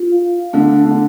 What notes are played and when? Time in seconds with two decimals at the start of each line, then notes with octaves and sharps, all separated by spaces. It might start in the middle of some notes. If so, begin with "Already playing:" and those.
Already playing: F4
0.12 F5
0.53 D3 A3
0.85 D3